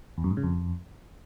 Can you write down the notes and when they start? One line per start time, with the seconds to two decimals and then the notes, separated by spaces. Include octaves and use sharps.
0.18 E2
0.24 F#2
0.31 G#2
0.37 C#3
0.43 F2